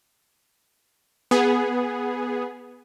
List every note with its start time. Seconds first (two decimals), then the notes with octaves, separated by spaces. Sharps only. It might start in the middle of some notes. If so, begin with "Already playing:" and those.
1.31 B3 G#4